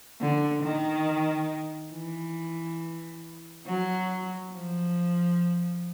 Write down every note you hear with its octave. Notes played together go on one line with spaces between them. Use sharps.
D3
D#3
E3
F#3
F3